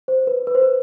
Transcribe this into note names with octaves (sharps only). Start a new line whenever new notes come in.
C5
B4
B4
C5
B4